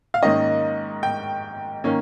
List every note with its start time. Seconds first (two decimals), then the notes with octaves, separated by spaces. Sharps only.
0.14 F5
0.22 G#2 D#3 A#3 C#4 D#5
1.03 G5
1.84 D#3 A#3 C#4